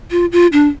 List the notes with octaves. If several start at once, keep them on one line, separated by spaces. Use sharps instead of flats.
F4
F4
D4